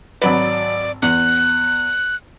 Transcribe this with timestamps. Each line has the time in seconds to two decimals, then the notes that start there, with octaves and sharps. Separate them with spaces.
0.22 G#1 F#3 B4 D5
1.02 E2 F#6